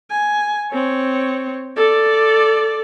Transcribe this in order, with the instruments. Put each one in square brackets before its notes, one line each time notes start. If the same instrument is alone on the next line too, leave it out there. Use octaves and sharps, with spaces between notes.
[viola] G#5
C4 C#5
A4 D5